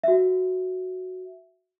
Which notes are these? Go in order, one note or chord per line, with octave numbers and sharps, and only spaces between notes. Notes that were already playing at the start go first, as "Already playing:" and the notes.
F#4 E5